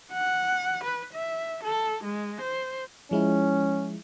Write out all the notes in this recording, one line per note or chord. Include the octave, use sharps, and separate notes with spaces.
F#5
B4
E5
A4
G#3
C5
F3 G#3 C#4 E4